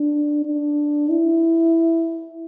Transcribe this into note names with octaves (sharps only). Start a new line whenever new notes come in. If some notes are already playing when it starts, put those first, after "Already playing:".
Already playing: D4
D4
E4